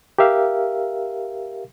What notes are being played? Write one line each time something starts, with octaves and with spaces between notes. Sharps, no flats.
G4 A#4 E5 F5